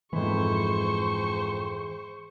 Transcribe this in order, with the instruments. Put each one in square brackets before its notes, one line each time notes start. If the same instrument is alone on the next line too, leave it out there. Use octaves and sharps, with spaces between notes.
[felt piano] F2 G#2 [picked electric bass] E3 [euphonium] G#4 [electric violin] C5 C#6